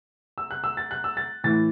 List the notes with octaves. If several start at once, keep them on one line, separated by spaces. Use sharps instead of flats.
E6
F#6
E6
A6
F#6
E6
A6
A2 E3 A6